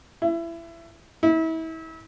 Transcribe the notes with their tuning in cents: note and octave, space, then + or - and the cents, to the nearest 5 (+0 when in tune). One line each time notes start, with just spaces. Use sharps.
E4 +25
E4 -35